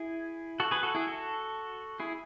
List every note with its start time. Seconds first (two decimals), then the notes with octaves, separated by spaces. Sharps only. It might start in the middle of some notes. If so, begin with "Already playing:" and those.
Already playing: E4 G#4
0.60 F#4 A4
0.71 G#4 B4
0.83 F#4 A4
0.95 E4 G#4
1.07 F#4 A4
2.00 E4 G#4